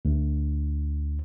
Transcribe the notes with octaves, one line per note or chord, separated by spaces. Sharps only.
D2